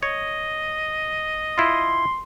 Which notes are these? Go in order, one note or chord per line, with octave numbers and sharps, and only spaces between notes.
C#5 D#5
E4 F4 C6